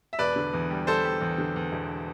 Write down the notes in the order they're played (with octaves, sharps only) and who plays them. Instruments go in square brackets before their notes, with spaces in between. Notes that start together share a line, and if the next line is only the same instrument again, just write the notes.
[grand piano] E5
E1 B4 D5
D3
E2
G3
G3 A4 C5
G3
E2
D3
E2
E1